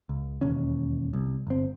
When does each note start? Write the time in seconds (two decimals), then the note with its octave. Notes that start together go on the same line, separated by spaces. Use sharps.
0.09 C#2
0.41 E1 D#2 C#4
1.13 C2
1.47 G1 C4